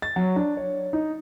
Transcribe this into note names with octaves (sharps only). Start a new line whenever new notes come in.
A6
F#3
D4
C#5
D#4